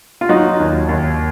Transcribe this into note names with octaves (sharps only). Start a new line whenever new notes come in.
F4
F#3 D#4 F#4
D#2
D#2